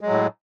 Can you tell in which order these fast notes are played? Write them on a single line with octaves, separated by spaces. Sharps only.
G#3 F#3 A2